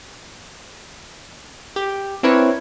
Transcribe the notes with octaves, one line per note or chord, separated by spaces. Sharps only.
G4
C4 D4 E4 A#4 B4 C#5